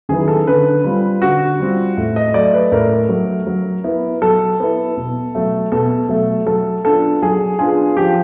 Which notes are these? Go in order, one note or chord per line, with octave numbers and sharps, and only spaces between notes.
D#3 F#3 B3 E4 G#4
A4
D3 B4
G3 C4 F4
D3 F#4
G3 C4 F4
A2
D#5
F#3 A3 D5
B4
A2 A#4
F#3 A3
F#3
B3 E4
F#3 A4
B3 E4
B2
F#3 A3
B2 A4
F#3 A3
F#3 A4
B3 D4 F4 A4
F#3 G#4
B3 D4 F4 G#4
F3 G4